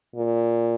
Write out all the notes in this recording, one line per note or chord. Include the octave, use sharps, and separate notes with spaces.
A#2